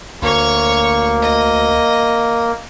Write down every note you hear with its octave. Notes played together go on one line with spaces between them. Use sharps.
D2 A#3 C#5 C#6
D#5